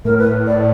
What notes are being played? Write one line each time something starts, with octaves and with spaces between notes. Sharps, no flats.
A2 A#4
B4
D5